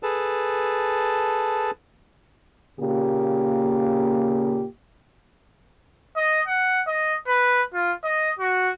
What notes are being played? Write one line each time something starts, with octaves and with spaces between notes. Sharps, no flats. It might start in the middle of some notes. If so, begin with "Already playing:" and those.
G#4 A4 B4 A5
A#2 C#3 A#3 G4
D#5
F#5
D#5
B4
F4
D#5
F#4